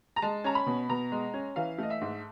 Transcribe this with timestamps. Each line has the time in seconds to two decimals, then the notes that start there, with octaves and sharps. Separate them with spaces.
0.16 A#5
0.22 G#3 A5
0.44 C#4 A#5
0.55 B5
0.66 B2
0.89 B2 A#5
1.12 G#3
1.34 C#4
1.56 E3 F5
1.78 A3 D#5
1.90 E5
2.01 G#2